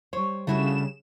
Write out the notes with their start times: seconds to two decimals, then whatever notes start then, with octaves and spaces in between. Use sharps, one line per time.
0.13 G3 C5 C#5
0.47 C#3 G3 A3 D4 E4 F#4 E7